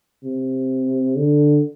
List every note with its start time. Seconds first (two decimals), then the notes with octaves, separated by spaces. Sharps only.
0.24 C3
1.16 D3